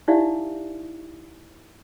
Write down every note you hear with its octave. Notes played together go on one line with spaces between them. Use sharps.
D#4 E4 G4 D5 E5 F5